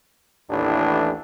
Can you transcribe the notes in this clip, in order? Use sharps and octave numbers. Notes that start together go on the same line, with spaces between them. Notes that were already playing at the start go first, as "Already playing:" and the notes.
A1 D#2 A2 E3 D4